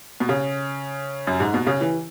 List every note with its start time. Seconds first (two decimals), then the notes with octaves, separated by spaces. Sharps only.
0.20 B2
0.29 C#3
1.27 F#2
1.40 G#2
1.54 B2
1.67 C#3
1.81 E3